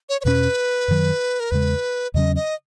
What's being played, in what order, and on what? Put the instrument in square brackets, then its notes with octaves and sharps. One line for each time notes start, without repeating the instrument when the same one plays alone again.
[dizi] C#5
C#5
[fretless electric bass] E2 B2 A#3 C#4 [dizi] B4
[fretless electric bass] F#2 D#3 F#3
[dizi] A#4
[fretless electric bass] E2 C#3 G#3 [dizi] B4
[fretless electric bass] E2 C#3 F#3 C#4 [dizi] D#5
[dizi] D#5